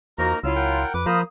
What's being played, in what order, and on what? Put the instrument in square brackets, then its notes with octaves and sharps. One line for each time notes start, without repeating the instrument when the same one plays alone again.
[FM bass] E2 [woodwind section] F3 F#4 A#5 [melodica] A#3 D#4 A#4
[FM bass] C#2 [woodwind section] F#3 E4 F4 [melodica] E6
[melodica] A#4 F#5 G5
[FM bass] F2 [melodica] B4 D6
[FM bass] F3 [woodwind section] A#3 F5 D#6 [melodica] C5 A#5 B5